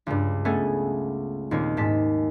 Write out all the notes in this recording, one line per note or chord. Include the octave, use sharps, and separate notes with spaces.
C#2 G2
A3 B3 C#4 G#4 A4
D#2 A#2 C4 D#4 C#5
G#2 G#3 A5 B6